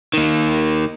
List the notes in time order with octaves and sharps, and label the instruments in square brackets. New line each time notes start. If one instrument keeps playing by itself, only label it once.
[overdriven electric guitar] D#3 A#3